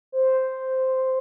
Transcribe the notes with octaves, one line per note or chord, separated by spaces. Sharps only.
C5